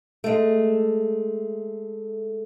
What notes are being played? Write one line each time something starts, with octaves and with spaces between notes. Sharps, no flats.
G#3 A3